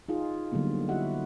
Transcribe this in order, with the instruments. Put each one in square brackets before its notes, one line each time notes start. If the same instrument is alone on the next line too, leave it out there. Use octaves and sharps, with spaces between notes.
[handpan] D#4 F4 G#4
D3 F#3 G3 A#3 B3
E4 F#4 G4 D#5 E5 F#5